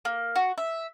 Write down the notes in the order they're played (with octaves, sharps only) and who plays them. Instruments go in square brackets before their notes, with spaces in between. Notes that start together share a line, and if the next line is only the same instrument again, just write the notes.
[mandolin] A#3
F#4
E5